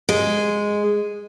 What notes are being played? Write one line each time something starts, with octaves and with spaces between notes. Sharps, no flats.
G#3